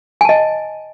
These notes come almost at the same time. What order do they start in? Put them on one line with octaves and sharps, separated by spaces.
G#5 A5 D#5